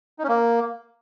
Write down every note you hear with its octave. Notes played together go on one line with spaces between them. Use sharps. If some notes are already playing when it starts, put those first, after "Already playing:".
D#4
C#4
A#3